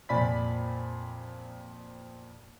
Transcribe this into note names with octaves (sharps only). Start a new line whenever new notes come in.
F2 A#2 D5 G#5 B5 B6